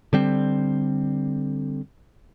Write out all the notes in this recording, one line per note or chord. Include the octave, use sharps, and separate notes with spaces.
D3 G3 C4